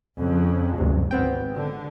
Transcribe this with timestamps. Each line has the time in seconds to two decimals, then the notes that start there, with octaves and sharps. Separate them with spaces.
0.19 F2 C#3 F3
0.78 F#1 D2 G2 C3
1.11 G#1 B3 C4 G5
1.56 D3